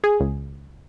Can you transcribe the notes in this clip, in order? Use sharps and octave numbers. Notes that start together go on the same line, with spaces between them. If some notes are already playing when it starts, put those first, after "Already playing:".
G#4
C#2